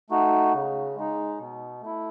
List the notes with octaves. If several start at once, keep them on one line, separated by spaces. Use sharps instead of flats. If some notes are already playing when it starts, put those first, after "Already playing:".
A3 D#4 F#4
C#3
G#3 D#4
B2
A3 E4